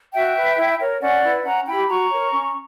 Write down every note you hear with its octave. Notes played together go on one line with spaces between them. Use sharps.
F#4 E5 G5
B4
E4
A#4 C#5
C#4 D5 F#5
E4 B4
C#4 F#5 A#5
E4 G4 G5 B5
F#4 A#5 C#6
A#4 C#5
C#4